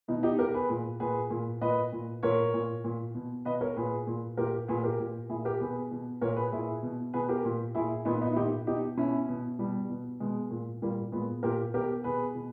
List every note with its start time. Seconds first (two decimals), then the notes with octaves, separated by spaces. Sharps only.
0.08 B2 B3 D#4
0.23 D#4 G4
0.38 B2 G4 A#4
0.54 G#4 B4
0.70 A#2
1.00 A#2 G#4 B4
1.30 A#2
1.61 A#2 B4 D#5
1.92 A#2
2.23 A#2 A#4 C#5
2.54 A#2
2.84 A#2
3.15 B2
3.45 B2 B4 D#5
3.61 A#4 C#5
3.76 A#2 G#4 B4
4.07 A#2
4.37 A#2 G4 A#4
4.68 A#2 G#4 B4
4.83 G4 A#4
4.99 A#2
5.29 A#2 E4 G#4
5.45 G4 A#4
5.60 B2 G#4 B4
5.91 B2
6.21 A#2 A#4 C#5
6.36 G#4 B4
6.52 A#2 E4 G#4
6.83 B2
7.13 B2 G#4 B4
7.29 G4 A#4
7.45 A#2
7.75 A#2 E4 G#4
8.05 A#2 B3 D#4
8.21 B3 D#4
8.32 E4
8.36 A#2 D#4 G4
8.67 B2 D#4 G4
8.97 B2 C#4 E4
9.29 B2
9.59 B2 G3
9.89 B2
10.20 B2 G#3
10.50 A#2
10.82 A#2 G3 A#3
11.12 A#2 G#3 B3
11.43 A#2 G4 A#4
11.74 B2 G4 A#4
12.04 B2 G#4 B4
12.35 B2